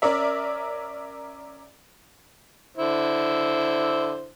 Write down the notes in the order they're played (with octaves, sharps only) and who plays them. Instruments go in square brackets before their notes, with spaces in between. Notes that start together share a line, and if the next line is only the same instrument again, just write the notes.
[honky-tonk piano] C#4 A#4 D5 E5
[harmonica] D3 E4 C5